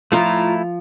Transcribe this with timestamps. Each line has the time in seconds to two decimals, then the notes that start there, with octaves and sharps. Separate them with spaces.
0.12 A2 F3 A3 E4 F4 A#5 F6